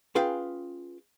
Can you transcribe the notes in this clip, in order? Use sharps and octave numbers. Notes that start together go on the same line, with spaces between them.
C#4 F4 G#4 B4 F5 G5